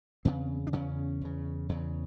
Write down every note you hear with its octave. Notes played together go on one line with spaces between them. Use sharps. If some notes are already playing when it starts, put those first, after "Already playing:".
E2 C#3 C4
D4
E2 C#3 C#4
E2 C#3
E2 C#3